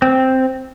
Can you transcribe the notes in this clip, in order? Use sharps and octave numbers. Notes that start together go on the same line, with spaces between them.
C4